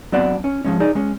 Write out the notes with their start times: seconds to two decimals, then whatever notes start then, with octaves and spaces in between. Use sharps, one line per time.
0.12 F#3 B3 C4 D4 D5 F#5
0.44 C#4
0.65 F3 G#3 C#4
0.80 D#4 G#4 D5
0.95 G#3 C#4